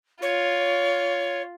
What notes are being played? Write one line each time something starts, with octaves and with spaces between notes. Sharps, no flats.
F4 C#5